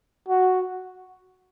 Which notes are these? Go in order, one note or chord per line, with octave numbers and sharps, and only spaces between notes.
F#4